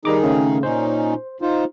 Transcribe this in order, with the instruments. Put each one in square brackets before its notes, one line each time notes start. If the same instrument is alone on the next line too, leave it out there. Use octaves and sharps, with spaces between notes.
[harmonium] D#3 D#4 G#4 [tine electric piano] G3 A#5 D6
[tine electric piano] C#3 A3 C#4
[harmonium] A#2 C#4 D#4 [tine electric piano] C5
[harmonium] D#4 F4 C5